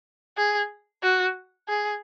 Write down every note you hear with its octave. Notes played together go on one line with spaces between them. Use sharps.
G#4
F#4
G#4